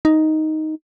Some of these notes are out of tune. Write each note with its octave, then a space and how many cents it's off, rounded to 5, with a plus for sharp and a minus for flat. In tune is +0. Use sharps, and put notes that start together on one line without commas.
D#4 +5